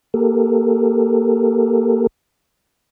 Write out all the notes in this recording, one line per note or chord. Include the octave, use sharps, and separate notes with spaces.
A#3 G4 A4 A#4